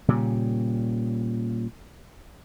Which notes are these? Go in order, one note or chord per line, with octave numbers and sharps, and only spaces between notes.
A#2 C#3 G3